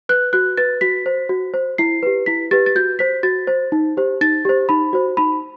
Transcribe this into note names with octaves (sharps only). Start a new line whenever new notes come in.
B4 F#6
F#4 F#6
B4 A6
F#4 B6
C5
F#4
C5
E4 C7
G4 B4
E4 B6
G4 B4 A6
A6
F#4 G6
C5 B6
F#4 A6
C5
D#4
G4 C5
D#4 A6
G4 C5
D#4 B5
F#4 C5
D#4 B5